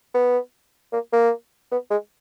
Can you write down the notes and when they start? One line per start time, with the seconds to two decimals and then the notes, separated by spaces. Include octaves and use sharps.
0.15 B3
0.93 A#3
1.13 A#3
1.72 B3
1.91 G#3